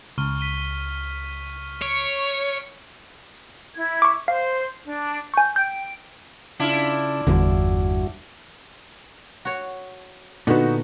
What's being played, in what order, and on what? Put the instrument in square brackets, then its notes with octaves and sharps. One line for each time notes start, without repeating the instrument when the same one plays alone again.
[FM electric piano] C#2 [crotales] C#6 F6 G7
[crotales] B6 D#7 G7
[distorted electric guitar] C#5 [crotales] D7
[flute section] E4 G#6
[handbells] C#6 D6
[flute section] C5 [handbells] F5
[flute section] D4
[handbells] G#5 C#6 [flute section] G6
[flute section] G5 [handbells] G6
[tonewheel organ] C#3 A5 [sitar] D4 E4 F4
[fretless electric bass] G1 E2 D3 [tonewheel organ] G2 F#4
[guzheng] F#4 C#5
[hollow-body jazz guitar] A#2 B3 [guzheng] D3 [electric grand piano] D#4 F#4